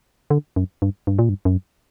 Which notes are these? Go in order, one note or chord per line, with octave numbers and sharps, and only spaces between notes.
D3
F#2
G2
G2
A#2
G2
F#2